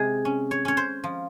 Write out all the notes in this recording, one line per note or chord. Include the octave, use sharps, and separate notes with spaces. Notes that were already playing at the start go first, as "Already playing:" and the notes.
Already playing: C3 G#3 G#4
C#4
C#5
C#4 C#5
C5
F3